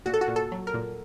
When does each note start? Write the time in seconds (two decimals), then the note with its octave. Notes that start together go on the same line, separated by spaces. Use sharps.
0.06 A#2 F#4
0.14 A4
0.21 F#4
0.28 A#2
0.36 A4
0.52 F#3
0.67 A#4
0.74 A#2